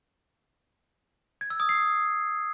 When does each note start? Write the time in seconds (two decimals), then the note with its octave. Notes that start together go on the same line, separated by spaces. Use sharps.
1.41 G#6
1.50 E6
1.60 D#6
1.69 C7